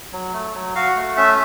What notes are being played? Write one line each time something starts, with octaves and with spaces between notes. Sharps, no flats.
F#3
A3
F#3
F#4 F5
A3
C#4 E5